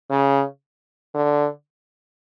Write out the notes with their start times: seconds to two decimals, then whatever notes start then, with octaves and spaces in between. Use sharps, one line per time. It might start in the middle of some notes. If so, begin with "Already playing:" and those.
0.11 C#3
1.15 D3